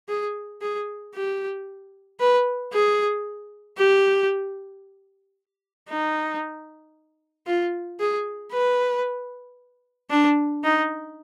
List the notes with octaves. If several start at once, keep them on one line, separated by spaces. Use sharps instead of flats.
G#4
G#4
G4
B4
G#4
G4
D#4
F4
G#4
B4
D4
D#4